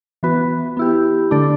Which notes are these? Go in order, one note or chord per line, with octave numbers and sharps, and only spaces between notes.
E3 B3 F#4 B4
B3 E4 G4
D3 A3 D4 A4 D5